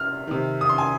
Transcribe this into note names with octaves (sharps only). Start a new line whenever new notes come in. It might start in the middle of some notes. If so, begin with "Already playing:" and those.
Already playing: C3 F6
C3 D#3
D#6
C6
G#5